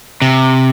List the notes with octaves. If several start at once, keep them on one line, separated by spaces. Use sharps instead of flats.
C3